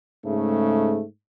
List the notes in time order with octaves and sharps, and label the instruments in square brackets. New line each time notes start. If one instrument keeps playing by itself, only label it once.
[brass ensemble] G#2 C#3 A3